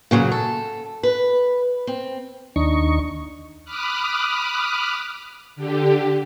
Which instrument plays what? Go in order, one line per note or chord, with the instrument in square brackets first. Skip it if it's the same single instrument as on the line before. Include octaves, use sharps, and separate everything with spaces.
[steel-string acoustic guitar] A#2 C#3 F#3
A4
B4
C4
[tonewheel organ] D#2 D#4 C#6 [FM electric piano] D4
[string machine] B5 D6 D#6 F6 F#6
D3 G4